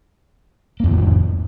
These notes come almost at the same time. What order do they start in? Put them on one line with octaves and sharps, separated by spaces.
A#3 F2 D#3 A2